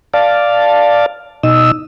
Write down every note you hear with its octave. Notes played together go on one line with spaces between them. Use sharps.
D5 F5 A5
B2 D#4 D#5 E6